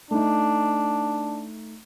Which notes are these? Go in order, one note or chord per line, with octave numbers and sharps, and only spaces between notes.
A3 D4 D#4